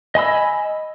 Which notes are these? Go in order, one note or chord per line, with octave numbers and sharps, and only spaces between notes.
D#5 G#5 B5 E6